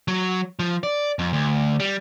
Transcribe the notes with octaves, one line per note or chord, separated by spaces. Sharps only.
F#3
F3
D5
F2
D2
G3